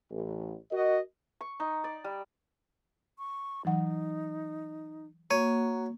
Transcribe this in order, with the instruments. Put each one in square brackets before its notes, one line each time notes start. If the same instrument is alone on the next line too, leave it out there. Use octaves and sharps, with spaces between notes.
[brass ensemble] A1
F#4 A#4 D#5
[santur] C#6
D#4
D5
G3
[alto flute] C#6
[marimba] E3 F#3 F#5 [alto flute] D#4
[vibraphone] A#3 [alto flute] F#4 [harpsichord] C#5